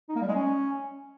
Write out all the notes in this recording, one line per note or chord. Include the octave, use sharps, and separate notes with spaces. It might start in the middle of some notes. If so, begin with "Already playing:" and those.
D#4
A#3
G3
G#3
C#4